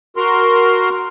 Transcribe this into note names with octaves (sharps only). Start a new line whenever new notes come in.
F#4 A#4 C6 F6